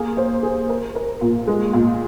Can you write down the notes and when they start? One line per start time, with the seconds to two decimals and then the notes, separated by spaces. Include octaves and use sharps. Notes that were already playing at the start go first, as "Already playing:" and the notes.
Already playing: A#3 G#4
0.17 C5
0.43 G#4
0.69 A#4
0.95 A#4
1.21 A#2
1.47 G#3
1.73 A#2